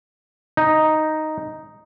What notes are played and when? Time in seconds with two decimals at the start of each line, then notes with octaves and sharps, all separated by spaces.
0.57 D#4